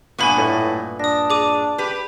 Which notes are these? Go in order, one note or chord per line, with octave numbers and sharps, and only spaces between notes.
G2 A#2 B3 G#5 B5 C#6
A2
D4 D#6 A#6
G#4 D6 D#7
G4 B4